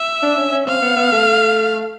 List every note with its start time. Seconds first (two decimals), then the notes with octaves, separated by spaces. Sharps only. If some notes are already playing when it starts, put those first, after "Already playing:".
Already playing: E5
0.23 D4
0.37 C#4
0.52 C#4
0.67 C4 F5
0.82 B3
0.96 B3
1.12 A3